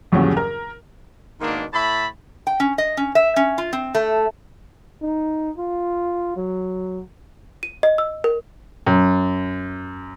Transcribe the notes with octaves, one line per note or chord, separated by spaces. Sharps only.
A#1 E2 G2 C#3 F#3
A#4
G#2 B2 D#3 A#3 D4
A2 E5 A5 B5
G5
C#4
D#5
C#4
E5
C#4
F4
C4
A3
D#4
F4
F#3
D#7
D#5
E6
A#4
F#2